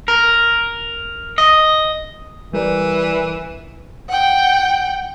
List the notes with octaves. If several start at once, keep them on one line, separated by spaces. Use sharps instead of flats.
A#4
D#5
E3 G3 A#4 D5
F#5 G5